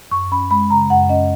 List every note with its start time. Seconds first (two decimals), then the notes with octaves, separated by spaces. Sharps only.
0.11 F#2 C#6
0.32 C#4 B5
0.50 G#3 B5
0.70 C#3 A#5
0.90 F#2 F#5
1.09 C#4 D#5